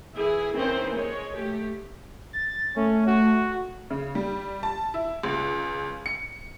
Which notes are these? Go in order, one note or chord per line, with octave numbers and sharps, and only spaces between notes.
E3 E4 G#4
D#3 E3 C4 C#4 C5
G#3 C#5
A3 G4
A6
A3 C#4
F#4
C#3
G3
A5
E4
C#2
C#7